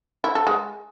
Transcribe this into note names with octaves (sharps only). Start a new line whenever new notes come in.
E4
A4
G#3